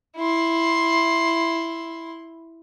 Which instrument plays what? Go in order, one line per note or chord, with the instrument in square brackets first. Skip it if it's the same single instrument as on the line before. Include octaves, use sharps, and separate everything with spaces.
[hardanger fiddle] E4 C6